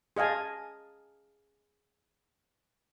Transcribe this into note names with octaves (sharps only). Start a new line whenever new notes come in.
G#4 D#5 F5 G#5 A5